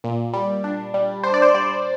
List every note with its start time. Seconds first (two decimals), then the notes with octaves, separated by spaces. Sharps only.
0.04 A#2
0.33 G3
0.64 D4
0.94 G3
1.23 D4 C5
1.34 D5
1.42 C5
1.54 G3 D5